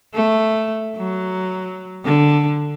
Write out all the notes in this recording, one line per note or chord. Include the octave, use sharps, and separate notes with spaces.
A3
F#3
D3